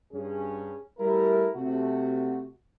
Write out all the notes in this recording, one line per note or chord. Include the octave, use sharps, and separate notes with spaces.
G2 C#4 G#4
G3 A3 E4 A#4
C3 A3 F#4